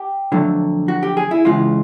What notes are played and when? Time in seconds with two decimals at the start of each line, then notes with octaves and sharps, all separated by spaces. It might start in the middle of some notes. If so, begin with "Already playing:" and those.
Already playing: G4
0.32 F2 D3 F#3 A3
0.88 F#4
1.03 G4
1.17 G#4
1.31 E4
1.45 C#2 C#3 E3 G#3 F4